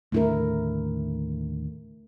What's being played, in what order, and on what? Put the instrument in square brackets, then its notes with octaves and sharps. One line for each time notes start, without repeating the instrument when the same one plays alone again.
[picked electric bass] D#2 A2 D3 [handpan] A3 E4 A#4